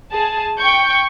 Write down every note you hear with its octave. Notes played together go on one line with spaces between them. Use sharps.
G#4 A5
G5 C#6 G6